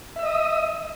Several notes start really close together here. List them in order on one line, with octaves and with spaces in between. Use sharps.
E5 E6 D#5 D#6